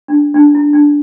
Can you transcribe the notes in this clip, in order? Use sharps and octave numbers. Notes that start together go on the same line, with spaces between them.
D4
D4
E4
D4